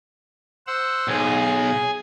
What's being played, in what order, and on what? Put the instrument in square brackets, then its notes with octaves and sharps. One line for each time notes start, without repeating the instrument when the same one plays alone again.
[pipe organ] C5 F#5 E6
[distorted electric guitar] B1 [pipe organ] G#4 G#5